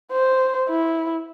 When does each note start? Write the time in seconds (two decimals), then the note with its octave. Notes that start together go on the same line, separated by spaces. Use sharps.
0.12 C5
0.69 E4